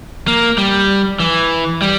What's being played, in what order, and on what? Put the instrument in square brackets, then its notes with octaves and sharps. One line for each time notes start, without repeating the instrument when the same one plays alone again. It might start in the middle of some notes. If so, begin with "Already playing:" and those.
[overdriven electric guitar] A#3
G3
E3
G3